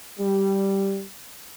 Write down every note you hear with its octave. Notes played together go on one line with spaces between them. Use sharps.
G3